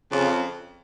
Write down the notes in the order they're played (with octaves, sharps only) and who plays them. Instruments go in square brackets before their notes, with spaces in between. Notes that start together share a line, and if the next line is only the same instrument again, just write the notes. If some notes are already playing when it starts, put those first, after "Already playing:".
[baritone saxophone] F2 [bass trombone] C#3